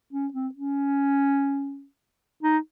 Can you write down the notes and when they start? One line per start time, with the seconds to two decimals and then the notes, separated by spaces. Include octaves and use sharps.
0.13 C#4
0.33 C4
0.54 C#4
2.43 D#4